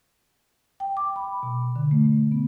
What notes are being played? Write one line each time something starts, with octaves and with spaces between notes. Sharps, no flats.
G5
D6
B5
B2
D3
A3
B3